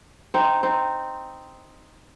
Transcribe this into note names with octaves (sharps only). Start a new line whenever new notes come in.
C4 D#4
C4 D#4